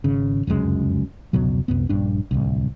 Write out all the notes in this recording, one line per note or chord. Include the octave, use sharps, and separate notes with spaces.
G#1 C#3
F1 C#2 F#2 G#3
F1 C#2 B2 F#3
C2 F#2 B3
A#1 G2 D4
D1 G1 C2